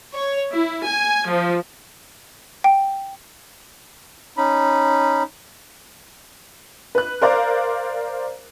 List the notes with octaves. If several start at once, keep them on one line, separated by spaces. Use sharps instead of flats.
C#5
E4
G#5
F3
G5
C#4 D#4 B5
B4 F#6
A#4 C5 D5 F5 A#5